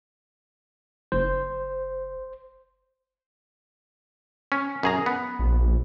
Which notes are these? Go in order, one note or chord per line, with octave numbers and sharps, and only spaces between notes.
F#1 C5
C#4
F#2 G#4 A#5
B3
A#1